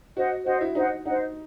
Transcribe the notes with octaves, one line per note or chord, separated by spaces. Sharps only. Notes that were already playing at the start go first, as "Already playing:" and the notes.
F#4 C5 D#5 F#5
F#4 C5 D#5 F#5
E4
D#4 C5 D#5 F#5
D#4 C5 D#5 F#5